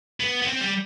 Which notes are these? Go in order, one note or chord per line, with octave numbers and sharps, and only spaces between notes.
B3
B3
C4
G3